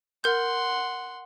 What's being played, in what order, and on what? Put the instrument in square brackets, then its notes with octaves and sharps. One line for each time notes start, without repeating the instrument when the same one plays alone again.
[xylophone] A#4 G6 [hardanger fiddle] F#5 C6